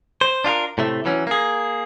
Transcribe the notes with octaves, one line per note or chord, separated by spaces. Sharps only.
C5
D4 F4 G4 A#4
A2 C3 A3
E3 F#3 C#4
A#3 G#4